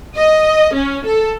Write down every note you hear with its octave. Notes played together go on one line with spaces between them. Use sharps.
D#5
C#4
A4